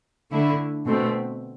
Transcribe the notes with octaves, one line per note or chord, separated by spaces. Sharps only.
D3 A3 E4
B2 A3 C4